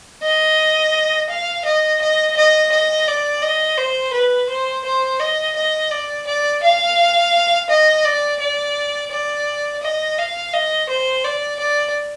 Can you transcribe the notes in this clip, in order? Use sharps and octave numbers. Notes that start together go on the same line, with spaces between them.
D#5
F5
D#5
D#5
D#5
D#5
D5
D#5
C5
B4
C5
C5
D#5
D#5
D5
D5
F5
D#5
D5
D5
D5
D#5
F5
D#5
C5
D5
D5